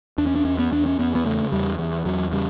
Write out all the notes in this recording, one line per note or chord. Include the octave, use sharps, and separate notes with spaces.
E2 D4
C#4
D4
E2 C#4
B3
E2 D4
C#4
E2 B3
B3
C#3 A3
E2 G3
E2
E2 F#3
C#3 G3